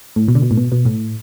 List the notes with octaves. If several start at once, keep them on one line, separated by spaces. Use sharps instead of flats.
A2
B2
D3
B2
A2
B2
B2
A2